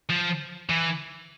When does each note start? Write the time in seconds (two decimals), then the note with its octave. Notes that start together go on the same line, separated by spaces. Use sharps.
0.09 F3
0.70 E3